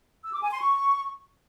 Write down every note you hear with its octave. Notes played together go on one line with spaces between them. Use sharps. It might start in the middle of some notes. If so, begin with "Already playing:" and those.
E6
D6
G#5
C6
C#6